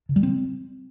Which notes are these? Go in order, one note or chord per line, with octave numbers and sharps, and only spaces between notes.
C#3
G3
C4